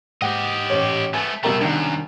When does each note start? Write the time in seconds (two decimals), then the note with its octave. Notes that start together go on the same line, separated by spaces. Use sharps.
0.22 G#2 G4 D#5 F#5 G5
0.70 A1 C#5
1.14 A3 B3 G#5
1.43 C2 B2 A3 E4 A#4 G5 A#5
1.61 F#2 D#3 D4